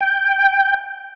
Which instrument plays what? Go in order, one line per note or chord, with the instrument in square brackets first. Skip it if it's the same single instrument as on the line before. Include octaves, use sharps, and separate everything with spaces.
[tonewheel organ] G5